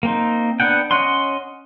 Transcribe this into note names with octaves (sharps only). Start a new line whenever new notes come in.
A#3 C4 D#4
B3 D4 F#5 G5
C#4 C#5 D#5 F#5 C6